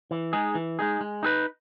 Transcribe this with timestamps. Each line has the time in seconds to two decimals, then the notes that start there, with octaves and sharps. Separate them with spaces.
0.11 E3
0.33 G#3 D#4 G#4
0.55 E3
0.79 G#3 D#4 G#4
1.01 G#3
1.23 D#4 G#4 B4